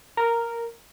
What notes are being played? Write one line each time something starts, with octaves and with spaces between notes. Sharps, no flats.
A#4